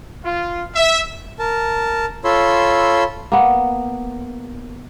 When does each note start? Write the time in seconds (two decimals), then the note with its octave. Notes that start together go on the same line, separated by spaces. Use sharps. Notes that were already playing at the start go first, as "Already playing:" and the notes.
0.24 F4
0.75 E5
1.39 A#4 A5
2.24 F4 A4 C#5 B5 C6 E6
3.32 A#3 B3